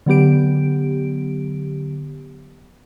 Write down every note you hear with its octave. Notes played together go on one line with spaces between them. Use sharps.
D3 F#3 B3 G4 D7